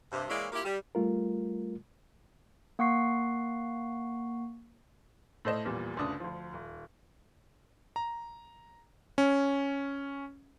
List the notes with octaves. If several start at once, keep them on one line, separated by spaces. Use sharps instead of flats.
G2 C3
E3 G#3 A#3 E4 C#5 D5
A#3 E4 F4 G4
G3
G3 A3 F4 A#4
A#3 F#5 C#6 C7
A2 A4 C5 D#5 E7
A#1 E2 A#2 G3
G1 D2 C#3 D4 D#6
D2 F3
D#1
A#5
C#4